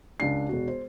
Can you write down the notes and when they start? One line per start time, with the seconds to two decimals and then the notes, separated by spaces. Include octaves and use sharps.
0.20 C#2 D4 C7
0.49 E1 F#4
0.68 C5